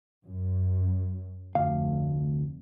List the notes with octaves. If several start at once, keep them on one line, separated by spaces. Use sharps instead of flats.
F#2
F1 D2 F5